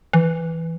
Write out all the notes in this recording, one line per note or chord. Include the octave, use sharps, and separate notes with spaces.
E3